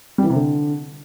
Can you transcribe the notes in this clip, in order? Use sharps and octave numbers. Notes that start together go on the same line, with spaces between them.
G3
E3
C3
D3